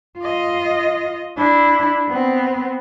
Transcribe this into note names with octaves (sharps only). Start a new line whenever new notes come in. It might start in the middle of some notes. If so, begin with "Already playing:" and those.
F4 D#5
D4 E4
B3 C4